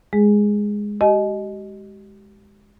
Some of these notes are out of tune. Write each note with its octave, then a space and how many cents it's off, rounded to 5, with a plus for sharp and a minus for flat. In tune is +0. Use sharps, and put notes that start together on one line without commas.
G#3 -5 G#4 -5
G4 -35 D#5 +0 G#5 +40